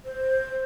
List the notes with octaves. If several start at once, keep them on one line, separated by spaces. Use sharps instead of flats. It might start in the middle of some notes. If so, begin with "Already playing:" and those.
C5